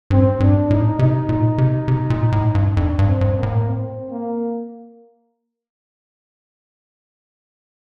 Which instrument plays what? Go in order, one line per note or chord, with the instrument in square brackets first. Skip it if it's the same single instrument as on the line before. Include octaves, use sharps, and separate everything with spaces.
[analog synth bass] G2 [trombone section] C4
[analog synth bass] G2 [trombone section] D4
[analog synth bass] A2 [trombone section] D#4
[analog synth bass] C3 [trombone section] D#4
[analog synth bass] A#2
C3
C3
A#2
A2
G2
[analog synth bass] F2 [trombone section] D4
[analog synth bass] G2
[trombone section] C4
[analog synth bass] G2
[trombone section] A#3
[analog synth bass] A2
[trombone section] C4
A#3